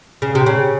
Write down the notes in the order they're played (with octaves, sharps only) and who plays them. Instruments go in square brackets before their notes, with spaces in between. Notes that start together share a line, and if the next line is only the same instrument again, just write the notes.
[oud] C#3
C3
C#3